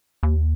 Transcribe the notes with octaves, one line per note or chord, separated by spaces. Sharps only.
D#2